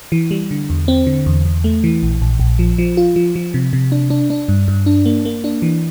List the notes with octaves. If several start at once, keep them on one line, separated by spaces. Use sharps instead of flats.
E3
G3
D3
E2
C4
D3
E2
E2
A3
E3
A#1
A#1
A#1
F3
F3
F4
F3
F3
C3
C3
D4
D4
D4
G2
G2
D4
A#3
A#3
D4
E3